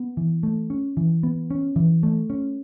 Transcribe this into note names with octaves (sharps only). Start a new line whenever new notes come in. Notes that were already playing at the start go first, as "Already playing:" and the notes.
Already playing: B3
E3
A3
C#4
E3
B3
C#4
E3
A3
C#4